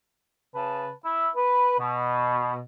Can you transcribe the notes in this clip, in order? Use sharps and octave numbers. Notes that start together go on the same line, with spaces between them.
C#3 B4 A5
E4
B4
B2